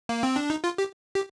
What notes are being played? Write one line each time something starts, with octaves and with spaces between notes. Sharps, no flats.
A#3
C4
D4
D#4
F4
G4
G4